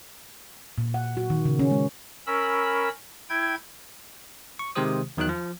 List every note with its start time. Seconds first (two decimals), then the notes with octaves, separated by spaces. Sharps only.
0.78 A#2
0.94 F#5
1.17 F#4
1.30 D#3
1.45 C#3
1.59 C#4
1.71 G#3
2.26 C#4 A#4 B5 E6
3.30 E4 G5 G#6
4.59 C#6
4.75 C3 D#3 G#3 G4 C5 D#6
5.17 E2 D#3 F#3 D#4 F#6
5.29 F3